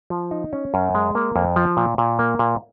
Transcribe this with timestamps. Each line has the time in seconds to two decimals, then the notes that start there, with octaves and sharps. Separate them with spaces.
0.10 F3
0.31 D#4
0.53 C#4
0.74 F#2
0.95 G#3
1.15 A#3
1.36 F2
1.56 F3
1.77 A#2
1.98 A#2
2.19 A#3
2.39 A#2